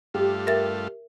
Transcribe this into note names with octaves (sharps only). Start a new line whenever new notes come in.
G2 A3 F4 G4
A#4 E5 A6